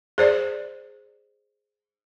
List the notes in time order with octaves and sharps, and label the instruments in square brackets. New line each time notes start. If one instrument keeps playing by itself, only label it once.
[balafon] G#4 C5 D5